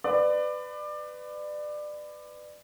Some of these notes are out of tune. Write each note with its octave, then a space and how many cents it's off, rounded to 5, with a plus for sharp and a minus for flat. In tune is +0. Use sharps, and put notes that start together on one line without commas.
B4 +25 D5 +25